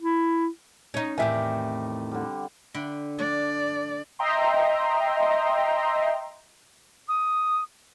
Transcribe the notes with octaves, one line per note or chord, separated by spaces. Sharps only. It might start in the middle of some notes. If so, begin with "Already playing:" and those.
E4
C#4 D#4 C#5
E2 A2 C3 D#3 G4 D5 E5 G#5
D3 G3
D3 G5 B5
D4 D5
D#5 E5 G5 A#5 C6
D#6